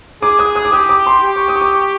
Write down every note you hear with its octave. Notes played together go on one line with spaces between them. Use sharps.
G#4 D6
D#6
D#6
D6
G4 D#6
D6
C6
G4
C#6
D#6
C#6
D6
C#6